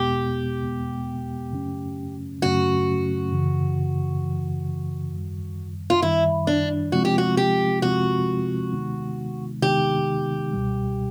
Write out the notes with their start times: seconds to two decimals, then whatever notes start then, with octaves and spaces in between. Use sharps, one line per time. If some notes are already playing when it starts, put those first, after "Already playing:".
Already playing: E2 B2 G#3 B3 G4
0.61 E2 B2 G#3 B3
1.52 F#2 C#3 F#3 A3 C#4
2.42 F#2 C#3 F#3 A3 C#4 F#4
3.31 F#2 C#3 E3
4.22 F#2 C#3 E3
5.11 F#2 D#3 G3
5.90 F4
6.02 F#2 D#3 G3 E4
6.47 D4
6.92 C3 F3 G#3 C4 F4 F#4
7.05 G4
7.18 F#4
7.37 G4
7.82 C3 F3 G#3 C4 F4 F#4
8.72 C3 D#3 G#3 B3 D#4
9.62 C3 D#3 G#3 B3 D#4 G4
10.53 C#2 B2 G3